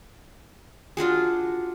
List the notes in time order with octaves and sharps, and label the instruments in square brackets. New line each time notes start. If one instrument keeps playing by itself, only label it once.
[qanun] D4 F4 F#4 G#4